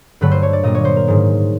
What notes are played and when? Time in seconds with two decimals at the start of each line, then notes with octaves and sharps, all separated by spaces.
0.21 G2 D3 F#3 A3 B4
0.31 C5
0.42 C#5
0.53 D5
0.63 A#2 G3 A#3 D#5
0.75 C#5
0.85 C5
0.96 A#4
1.07 G#2 D#3 G#3